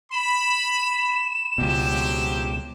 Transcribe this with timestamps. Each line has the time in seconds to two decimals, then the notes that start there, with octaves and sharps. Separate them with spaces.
0.12 B5 E7
1.58 C#2 B2 F3 F#3 G4